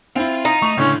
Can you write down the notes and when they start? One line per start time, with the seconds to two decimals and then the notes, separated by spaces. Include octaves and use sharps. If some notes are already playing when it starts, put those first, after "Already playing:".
0.16 C4 E4 F4 F5
0.45 D#4
0.62 A3 C#6 F7
0.78 C#2 A2 D3 C#4